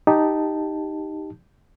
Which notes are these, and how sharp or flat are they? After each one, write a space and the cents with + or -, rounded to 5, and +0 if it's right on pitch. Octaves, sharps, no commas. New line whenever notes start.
D#4 +0 G4 +0 A5 +0